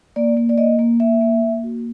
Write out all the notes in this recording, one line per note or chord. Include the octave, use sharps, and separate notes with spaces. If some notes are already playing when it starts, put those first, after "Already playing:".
A#3 D5
A#3
D5
A#3 D#5
A#3
A#3 E5
A#3
A#3
F#4